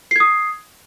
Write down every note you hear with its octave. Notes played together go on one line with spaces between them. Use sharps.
D#6 G#6 C7